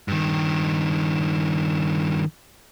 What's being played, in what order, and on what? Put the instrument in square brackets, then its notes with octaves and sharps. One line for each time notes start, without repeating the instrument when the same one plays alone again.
[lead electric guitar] G2 D#3